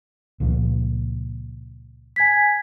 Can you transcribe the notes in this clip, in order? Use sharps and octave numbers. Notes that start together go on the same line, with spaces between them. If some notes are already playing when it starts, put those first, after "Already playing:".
C#2 A#2 F3
G#5 G#6 B6